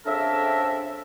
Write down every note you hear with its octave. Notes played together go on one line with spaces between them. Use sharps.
F2 C#3 D4 A4 A#4 E5